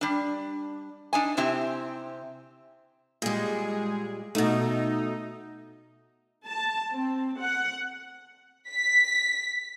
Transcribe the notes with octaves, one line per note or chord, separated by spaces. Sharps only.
G3 D4
D4 D#4 G#5
C3 C4 E4 G4
A#2 G3 G#3 G#4
B2 A3 D#4
A5
C4
F#5
B6